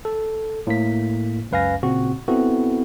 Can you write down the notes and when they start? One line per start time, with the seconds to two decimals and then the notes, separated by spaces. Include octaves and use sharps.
0.05 A4
0.67 A2 A#3 B6
1.51 C#2 F#2 B4 F5 G#5 A#6
1.83 A#2 C#3 C4 F#4
2.28 B3 C4 E4 F#4 A4